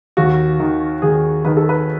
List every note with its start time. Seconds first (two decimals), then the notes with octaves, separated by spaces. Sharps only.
0.17 D#2 F#4
0.60 D#3
1.02 D#2 G#4
1.45 D#3 B4
1.57 A4
1.69 B4